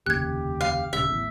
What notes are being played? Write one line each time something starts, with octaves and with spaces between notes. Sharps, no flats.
F1 D#2 C#3 G4 F#6 G#6
F5
D#1 C#3 E5
A1 E2